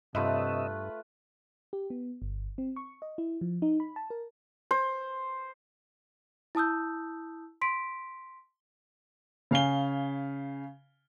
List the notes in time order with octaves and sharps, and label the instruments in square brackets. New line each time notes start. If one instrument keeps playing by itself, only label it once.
[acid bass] G2 [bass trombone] C3 [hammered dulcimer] A3 F4 B4 [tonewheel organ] D#5 E5
[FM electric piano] G4
B3
G1
C4
C#6
D#5
E4
F3
D#4
B5
A5
A#4
[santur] C5
[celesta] E4 A5 D#6 E6 G6
C6 B6 D7
[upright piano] C#3 F5 G#5 G7